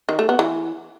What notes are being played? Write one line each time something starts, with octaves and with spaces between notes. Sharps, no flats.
D#3
A3
B3
E3